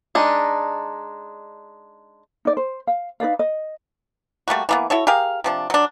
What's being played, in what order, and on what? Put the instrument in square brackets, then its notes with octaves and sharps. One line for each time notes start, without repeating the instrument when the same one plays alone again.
[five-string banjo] G#3 D4 D#4
[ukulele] D#4 D5
C5
F5
D#4 B4 D5 F5
D#5
[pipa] G3 A3 A#3 F#4
E3 A#3 B3
E4 F#4 A4 C#5
G4 G#4 A#4 F5
C3 F3 D4
F#3 D4